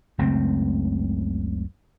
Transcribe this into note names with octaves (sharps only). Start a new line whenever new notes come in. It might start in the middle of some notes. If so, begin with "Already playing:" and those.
F#1 C#2 A3 C4